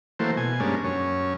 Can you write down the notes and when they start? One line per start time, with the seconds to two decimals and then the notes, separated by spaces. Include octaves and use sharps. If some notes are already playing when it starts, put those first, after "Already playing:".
0.19 E3 F#3 A3 A#3 C5
0.37 B2 G#5
0.60 G2 G#3 A#3 C#4 D4
0.84 F#2 C#4